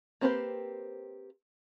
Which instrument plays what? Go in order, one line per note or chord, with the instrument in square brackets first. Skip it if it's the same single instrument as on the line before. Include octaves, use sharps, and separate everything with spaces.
[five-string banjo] A#3 C4 G4 B4 C5